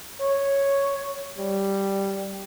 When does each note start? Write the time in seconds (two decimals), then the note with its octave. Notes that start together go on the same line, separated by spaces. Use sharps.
0.21 C#5
1.38 G3